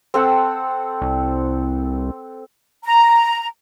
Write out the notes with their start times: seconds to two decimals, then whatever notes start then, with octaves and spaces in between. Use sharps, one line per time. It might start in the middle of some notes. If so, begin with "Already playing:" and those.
0.14 C4 A4 F#5
1.02 C2
2.84 A#5